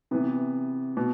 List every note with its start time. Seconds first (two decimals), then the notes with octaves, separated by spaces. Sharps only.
0.11 C3 E3 B3
0.97 B2